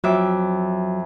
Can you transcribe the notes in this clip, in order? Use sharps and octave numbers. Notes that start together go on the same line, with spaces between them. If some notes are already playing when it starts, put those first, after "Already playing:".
F2 F#3 E5 D6